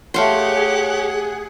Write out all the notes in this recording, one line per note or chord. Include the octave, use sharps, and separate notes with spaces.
A3 G4 G#4 C#5 F5 F#5 C6